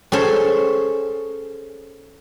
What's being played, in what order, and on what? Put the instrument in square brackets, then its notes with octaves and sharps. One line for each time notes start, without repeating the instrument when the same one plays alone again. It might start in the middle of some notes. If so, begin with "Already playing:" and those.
[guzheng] C#4 G#4 A4 C5